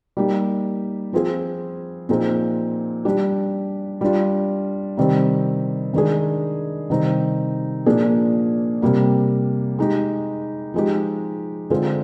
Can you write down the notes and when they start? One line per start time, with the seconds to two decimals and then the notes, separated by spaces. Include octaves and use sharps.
0.17 G3 A#3 D#4 G4
1.13 F3 C4 F4 G#4
2.09 A#2 F3 C4 D#4 G#4
3.05 G3 D4 G4
4.01 G3 D4 F4
4.97 C3 D#3 G3 C4
5.94 D#3 G#3 D4 G#4
6.90 C3 D#3 G3 C4 D#4
7.86 A#2 F3 A#3 D4 G#4
8.82 C3 G3 A#3
9.79 G#3 D#4 G4
10.74 F3 G#3 D#4 G4
11.70 D3 G#3 C4 F4 G#4